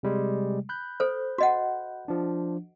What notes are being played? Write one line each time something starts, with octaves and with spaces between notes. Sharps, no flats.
C3 G3 G#3
B5 F#6 G6
A4 C5
F#4 D#5 F#5
F3 D4